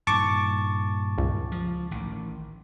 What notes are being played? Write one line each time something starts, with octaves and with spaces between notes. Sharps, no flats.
G2 A#2 D#3 A5 C#6 D6
C#2
F3
A1 D#3